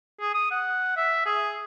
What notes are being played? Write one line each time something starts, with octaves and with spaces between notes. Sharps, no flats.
G#4
D#6
F#5
E5
G#4